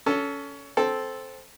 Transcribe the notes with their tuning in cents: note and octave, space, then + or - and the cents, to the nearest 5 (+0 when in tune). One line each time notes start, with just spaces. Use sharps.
C#4 +20 A4 +0
C4 +0 A4 -10